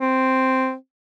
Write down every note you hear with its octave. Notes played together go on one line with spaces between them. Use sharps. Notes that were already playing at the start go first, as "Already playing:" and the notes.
C4